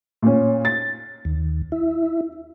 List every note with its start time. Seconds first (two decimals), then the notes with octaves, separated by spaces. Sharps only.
0.22 A#2 C#4
0.65 A6
1.25 D#2
1.72 E4